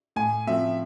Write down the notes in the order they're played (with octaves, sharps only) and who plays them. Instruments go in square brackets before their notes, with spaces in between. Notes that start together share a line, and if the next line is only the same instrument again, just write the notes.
[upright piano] A2 [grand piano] G#5
[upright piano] F3 A3 C4 [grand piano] E5